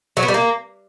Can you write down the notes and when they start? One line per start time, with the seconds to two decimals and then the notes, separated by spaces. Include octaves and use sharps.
0.17 F#3
0.23 B3
0.28 G3
0.34 A#3